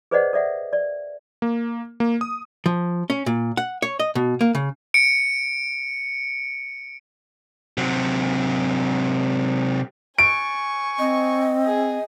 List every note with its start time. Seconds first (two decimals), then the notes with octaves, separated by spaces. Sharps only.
0.11 G#4 B4 C5 D5 D#5 F#5
0.33 A4 D5 E5 F#5
0.73 D5
1.42 A#3
2.00 A#3
2.21 D#6
2.66 F3
3.10 C#4
3.26 A#2
3.57 F#5
3.82 C#5
4.00 D#5
4.15 B2
4.41 A#3
4.55 C#3
4.94 C#7 D7
7.78 C3 F#3
10.19 G#5 C#6 D7
10.99 C4 D#5
11.66 G#4